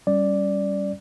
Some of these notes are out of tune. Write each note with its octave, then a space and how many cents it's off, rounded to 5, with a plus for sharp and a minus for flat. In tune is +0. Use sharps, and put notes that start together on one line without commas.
G3 -5 C#4 +0 D5 +0